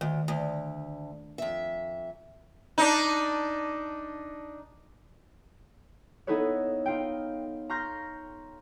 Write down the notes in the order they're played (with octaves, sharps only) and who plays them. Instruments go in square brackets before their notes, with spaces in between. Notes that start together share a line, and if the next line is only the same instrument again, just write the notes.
[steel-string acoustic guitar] D2 [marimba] D#3
[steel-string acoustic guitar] D2
F2 E5
[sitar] D4 D#4
[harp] B3 D#4 E4 A4 B4 C#5
D#4 F4 G5
A#5 C6 C#6 F6 G6 A#6